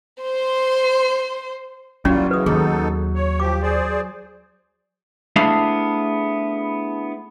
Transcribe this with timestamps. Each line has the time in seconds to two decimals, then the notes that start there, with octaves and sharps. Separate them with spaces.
0.21 C5 C6
2.05 F#3 G3 A#3 C#4 E4 F4
2.31 C#3 E3 G#3 B4 D#6
2.46 D#2 B3 D#4 G#4 A4
3.15 C#5
3.40 F3 G4 D6
3.62 G#4 C5 D5
5.36 A3 B3 D4 E4 G#4 F5